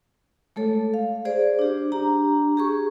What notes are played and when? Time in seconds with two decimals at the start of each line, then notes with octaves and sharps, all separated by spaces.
0.56 G#3 A3 A4 C#5
0.94 F5
1.25 G#4 C5 D5
1.59 D4 G4
1.92 D4 G4 A#5
2.57 G4 G#4 C#6